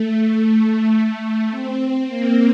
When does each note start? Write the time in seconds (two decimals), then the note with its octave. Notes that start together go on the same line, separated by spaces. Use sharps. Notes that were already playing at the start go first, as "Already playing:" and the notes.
Already playing: A3
0.96 A3
1.51 C4
2.08 A#3